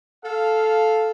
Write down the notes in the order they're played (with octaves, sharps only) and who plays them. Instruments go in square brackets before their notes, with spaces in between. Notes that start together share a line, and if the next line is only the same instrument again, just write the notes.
[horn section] A4 F5